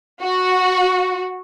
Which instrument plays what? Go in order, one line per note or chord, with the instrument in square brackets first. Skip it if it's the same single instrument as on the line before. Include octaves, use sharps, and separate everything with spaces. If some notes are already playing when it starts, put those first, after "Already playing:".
[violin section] F#4